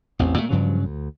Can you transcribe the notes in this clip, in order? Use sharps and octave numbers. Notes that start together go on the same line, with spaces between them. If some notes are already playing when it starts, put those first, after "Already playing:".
A1 E2 C4
A#2 A3
G2 C#3 F3 F#3
D2